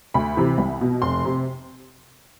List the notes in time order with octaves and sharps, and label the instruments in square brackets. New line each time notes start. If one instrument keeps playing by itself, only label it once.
[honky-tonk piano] D2 B5
C3 E3
C2
B2
F1 C6
C3